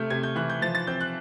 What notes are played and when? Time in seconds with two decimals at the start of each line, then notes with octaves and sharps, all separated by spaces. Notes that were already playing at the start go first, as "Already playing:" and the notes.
Already playing: C3 A3 F6 G6
0.10 C3 G#6
0.23 G6
0.36 E3 F#6
0.50 G6
0.62 F3 A6
0.75 A6
0.87 C4 G6
1.01 F#6